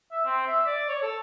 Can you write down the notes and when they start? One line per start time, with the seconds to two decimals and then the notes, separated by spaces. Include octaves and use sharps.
0.12 E5
0.25 C4
0.47 E5
0.66 D5
0.89 C#5
1.02 A4